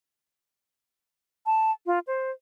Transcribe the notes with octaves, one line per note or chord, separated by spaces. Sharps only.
A5
F4
C5